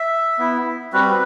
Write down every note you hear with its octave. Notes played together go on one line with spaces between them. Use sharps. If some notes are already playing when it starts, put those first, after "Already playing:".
Already playing: E5
B3 E4
G3 C4 F#4 B4